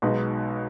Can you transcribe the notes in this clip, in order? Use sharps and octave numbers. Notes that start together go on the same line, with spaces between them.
B1 B2 G#3 B3 D#4